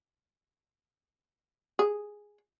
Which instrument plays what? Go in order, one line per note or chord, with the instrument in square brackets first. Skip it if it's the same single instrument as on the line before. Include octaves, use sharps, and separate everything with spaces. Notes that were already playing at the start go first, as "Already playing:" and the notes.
[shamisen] G#4